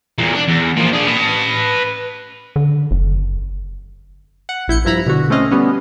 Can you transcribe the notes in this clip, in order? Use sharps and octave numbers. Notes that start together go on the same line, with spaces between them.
E2 A#2
D4
E2
A#2 F3
D4 G#4
B4 A5
D3
F#1
F#5
A#1 E4 G6 C#7
G2 F3 E4 A#5 B5
B2 D3 F#4
A3 C4 C#4 D#5 F5
G3 B3 C#4